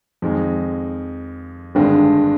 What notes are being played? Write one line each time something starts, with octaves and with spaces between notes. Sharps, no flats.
F2 D#3 G#3
G#1 G2 D3 G#3